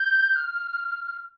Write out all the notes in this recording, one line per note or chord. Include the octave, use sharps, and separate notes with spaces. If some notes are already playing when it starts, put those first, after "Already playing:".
Already playing: G6
F6